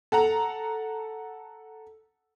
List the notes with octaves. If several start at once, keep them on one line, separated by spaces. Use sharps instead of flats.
A4 F#5 A#5